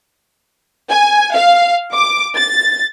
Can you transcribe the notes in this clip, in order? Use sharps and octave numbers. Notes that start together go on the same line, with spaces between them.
G#5
F5
D6
A6